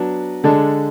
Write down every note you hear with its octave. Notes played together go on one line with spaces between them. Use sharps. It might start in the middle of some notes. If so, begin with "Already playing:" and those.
Already playing: F#3 B3 D4
D3 G#3 D4 A4